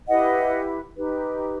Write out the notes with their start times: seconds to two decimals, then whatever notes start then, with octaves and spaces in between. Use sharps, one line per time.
0.08 E4 G4 B4 D#5 F#5
0.96 D#4 G4 B4